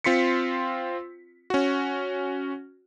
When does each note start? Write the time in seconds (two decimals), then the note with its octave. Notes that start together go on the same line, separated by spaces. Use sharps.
0.04 C4 F4 C6 B6 C#7
1.50 C#4 F#4